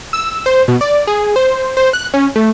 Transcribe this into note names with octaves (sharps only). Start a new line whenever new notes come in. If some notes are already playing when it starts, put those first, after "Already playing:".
E6
C5
B2
D5
G#4
C5
C5
F#6
C#4
A3